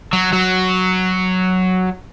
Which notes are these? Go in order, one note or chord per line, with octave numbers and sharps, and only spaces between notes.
F#3
F#3